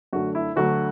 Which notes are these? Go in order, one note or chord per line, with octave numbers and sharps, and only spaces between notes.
F#2 D3 A3 F#4
E4
D2 D3 F#3 A3 F#4